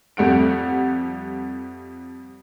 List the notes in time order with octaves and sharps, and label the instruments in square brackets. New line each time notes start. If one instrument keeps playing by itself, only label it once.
[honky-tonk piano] F2 G3 A3 F#5 D7